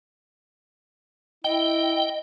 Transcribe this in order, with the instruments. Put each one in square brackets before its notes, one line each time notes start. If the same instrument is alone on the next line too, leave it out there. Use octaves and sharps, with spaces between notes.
[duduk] E4 [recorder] D#5 [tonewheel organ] G5